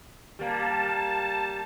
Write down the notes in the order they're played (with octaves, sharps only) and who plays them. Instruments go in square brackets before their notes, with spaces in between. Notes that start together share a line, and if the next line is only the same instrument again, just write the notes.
[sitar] G3 A#3 [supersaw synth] A5